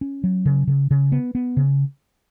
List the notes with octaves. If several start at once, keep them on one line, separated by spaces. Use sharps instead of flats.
C#4
F#3
C#3
C#3
C#3
B3
B3
C#3